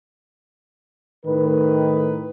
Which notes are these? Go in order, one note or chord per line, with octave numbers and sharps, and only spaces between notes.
A2 D#3 B4